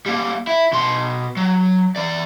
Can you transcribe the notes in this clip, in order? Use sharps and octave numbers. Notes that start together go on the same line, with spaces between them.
G3 A#3
E4
B2 C6
F#3
E3 D5